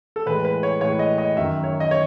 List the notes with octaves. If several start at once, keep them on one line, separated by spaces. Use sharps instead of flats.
A4
A2 E3 G#3 B4
B4
C#5
A2 E3 G#3 C#5
D#5
D#5
F#2 D#3 F#3 E5
C#5
D#5
C#5